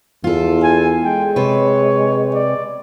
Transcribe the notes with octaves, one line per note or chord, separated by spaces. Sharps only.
E2 F4 A4
G#5
G#3 G5
C3 B4 C#5
D5